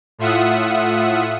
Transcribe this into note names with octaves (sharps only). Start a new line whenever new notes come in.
A2 F4 E5 F#5 D#6